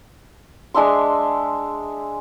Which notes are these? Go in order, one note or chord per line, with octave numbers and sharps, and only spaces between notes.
G#3 D4 E5 C6